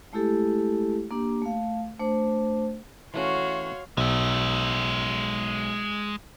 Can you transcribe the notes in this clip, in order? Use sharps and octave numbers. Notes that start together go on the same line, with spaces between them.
G#3 A3 E4 G4 A4
A#3 D4 G4
A3 F5
A3 D4 C5
E3 A3 C#4 F#4 C#5 F5 C6
B1 G#3 E5